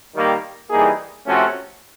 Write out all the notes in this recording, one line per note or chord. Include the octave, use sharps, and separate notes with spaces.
D#3 G3 A#3
E3 G3 A#3 D#4 G#4
C3 F3 A3 C#4 F#4